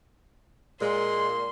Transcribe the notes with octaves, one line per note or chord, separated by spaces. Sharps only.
A#2 G#3 C6